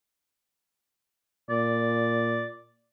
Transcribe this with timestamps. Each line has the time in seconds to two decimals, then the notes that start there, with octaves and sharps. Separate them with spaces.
1.50 A#2 D5